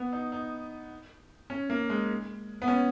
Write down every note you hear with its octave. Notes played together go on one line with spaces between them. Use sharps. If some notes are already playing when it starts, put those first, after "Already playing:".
Already playing: B3
D#4
D#4
C#4
A#3
G#3
B3
C#4